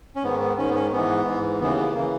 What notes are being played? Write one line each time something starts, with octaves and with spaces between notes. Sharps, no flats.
C#4
G#2 D#3 B3
B3
G#2 D#3 C#4
B3
C#4
G#2 E3 B3
G#2 E3
D#2 C#3 E3 B3
B3
C#3 E3 A#3